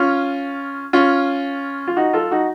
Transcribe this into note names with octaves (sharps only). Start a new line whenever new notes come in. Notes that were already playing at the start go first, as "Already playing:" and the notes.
Already playing: C#4 F4
C#4 F4
F4
D#4 F#4
F4 A4
D#4 F#4